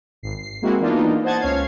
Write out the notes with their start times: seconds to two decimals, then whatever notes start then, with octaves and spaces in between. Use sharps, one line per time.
0.23 G#1 C7
0.39 C7
0.62 G#3 A#3 C4 E4 F#4
0.80 E3 A#3 B3 D4 D#4 F4
1.24 C5 D#5 F#5 A5 G#6 A6
1.40 C#2 C#4 C#5 F5 G#6 C7